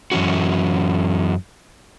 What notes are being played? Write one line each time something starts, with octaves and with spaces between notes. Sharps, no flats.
F#2 E3 C#4 F#4